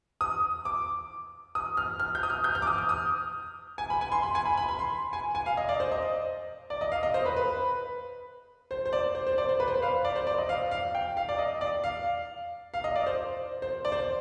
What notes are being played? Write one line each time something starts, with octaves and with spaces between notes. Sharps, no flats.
D#6
D6
D#6
F6
F6
G6
D#6
F6
G6
F6
D6
D#6
F6
D#6
G#5
B5
G#5
C6
B5
G#5
B5
B5
B5
C6
G#5
G#5
F5
D#5
D5
C5
D#5
D5
D#5
F5
D#5
C5
B4
B4
C5
C5
D5
C5
C5
D5
C5
B4
C5
B4
F5
D5
C5
D5
D#5
F5
F5
G5
F5
D5
D#5
D5
F5
F5
D#5
D5
C5
C5
D5
C5
D5